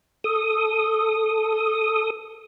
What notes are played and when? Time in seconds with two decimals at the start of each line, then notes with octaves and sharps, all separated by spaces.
0.24 A4 D#6